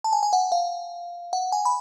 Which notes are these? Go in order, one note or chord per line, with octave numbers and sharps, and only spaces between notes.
A5
G#5
G#5
F#5
F5
F#5
G#5
B5